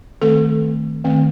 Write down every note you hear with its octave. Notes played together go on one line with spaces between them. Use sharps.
D#3 A3 C4 A4
D#3 A3 C4